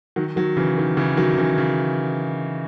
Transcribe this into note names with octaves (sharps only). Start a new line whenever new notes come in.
D#3 F#3
D#3 F#3
C#3 E3
D#3
C#3 E3
D#3 F#3
C#3 E3
C#3